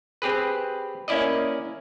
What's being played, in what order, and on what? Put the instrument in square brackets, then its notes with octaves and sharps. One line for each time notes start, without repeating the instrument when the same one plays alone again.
[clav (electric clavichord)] C4 G4 G#4 B4
A#3 C#4 E4 D5 D#5